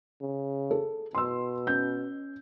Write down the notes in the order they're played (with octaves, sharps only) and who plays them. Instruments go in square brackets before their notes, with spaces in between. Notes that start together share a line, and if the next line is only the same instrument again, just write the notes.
[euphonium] C#3
[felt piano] G#4 A4
[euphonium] B2 [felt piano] C6 E6
[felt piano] C#4 G6